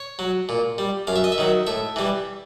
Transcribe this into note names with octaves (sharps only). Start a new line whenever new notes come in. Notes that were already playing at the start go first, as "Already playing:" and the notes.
Already playing: C#5
F#3
A#2
G3
F#2 F5
E5
D#5
E5
D#3 F#3
A2 E5
E3 G3